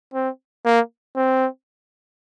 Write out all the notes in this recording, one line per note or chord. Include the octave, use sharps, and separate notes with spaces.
C4
A#3
C4